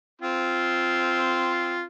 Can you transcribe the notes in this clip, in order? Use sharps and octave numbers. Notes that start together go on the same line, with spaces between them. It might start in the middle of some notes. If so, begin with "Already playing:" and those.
C4 F4